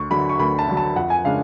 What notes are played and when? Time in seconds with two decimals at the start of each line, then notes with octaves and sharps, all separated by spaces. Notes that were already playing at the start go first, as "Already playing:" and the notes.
Already playing: D2 C#6
0.11 D3 F#3 B5
0.29 C#6
0.39 D2 B5
0.59 A5
0.68 D3 F#3
0.77 A5
0.96 F2 F#5
1.10 G#5
1.24 C#3 G#3 D4 F5